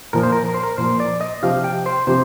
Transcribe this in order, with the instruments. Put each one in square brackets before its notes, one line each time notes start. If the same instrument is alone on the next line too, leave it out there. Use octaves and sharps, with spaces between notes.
[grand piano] A#2 F3 A#3 [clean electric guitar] A#4
[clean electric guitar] C5
A#4
A#4
C5
A#4
[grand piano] A#2 F3 A#3 [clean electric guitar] C5
[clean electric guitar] D5
D#5
[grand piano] C3 F3 C4 G4 [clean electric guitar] F5
[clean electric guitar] G5
C5
[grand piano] C3 F3 C4 G4 [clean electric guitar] C5